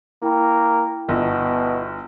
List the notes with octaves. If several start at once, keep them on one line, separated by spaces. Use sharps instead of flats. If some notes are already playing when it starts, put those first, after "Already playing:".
A#3 E4 G5 B5
G1 B2